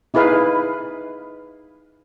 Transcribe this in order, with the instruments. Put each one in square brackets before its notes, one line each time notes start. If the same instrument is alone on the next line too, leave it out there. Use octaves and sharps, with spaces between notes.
[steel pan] D#4 E4 G#4 B4 F5